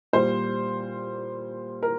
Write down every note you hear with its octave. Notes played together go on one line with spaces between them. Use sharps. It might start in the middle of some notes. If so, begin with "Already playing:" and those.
A#2 G3 C5
A#4